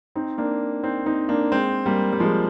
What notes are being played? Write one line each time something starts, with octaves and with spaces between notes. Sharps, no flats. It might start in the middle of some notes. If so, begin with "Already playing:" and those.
C4 D#4
A#3 D4
C4 D#4
C4 D#4
A#3 D4
G#3 C4
G3 A#3
G3
F3 G#3